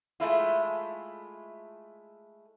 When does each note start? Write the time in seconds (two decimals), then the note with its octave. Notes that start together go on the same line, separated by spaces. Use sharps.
0.20 G#3 A3 E4 F4